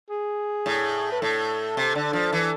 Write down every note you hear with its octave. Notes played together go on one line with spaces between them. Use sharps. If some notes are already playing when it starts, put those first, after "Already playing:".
G#4
A2
B4
A2 A4
C3
D3
F3
E3